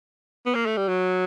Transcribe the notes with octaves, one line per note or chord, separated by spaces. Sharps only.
B3
A#3
A3
G3
F#3